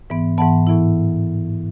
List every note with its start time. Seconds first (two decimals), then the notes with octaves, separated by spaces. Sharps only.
0.10 G#2 E3 B3
0.38 G#2 E3 B3 F#5 A5
0.67 A2 E3 B3 E4